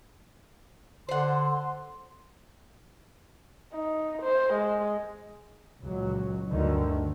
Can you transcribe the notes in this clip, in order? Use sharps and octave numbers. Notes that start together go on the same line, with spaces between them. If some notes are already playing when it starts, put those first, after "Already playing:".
D3 C5 F#5 C6
D#4
C5
G#3
C#2 A#2 F#3
D2 G2 D3 D#3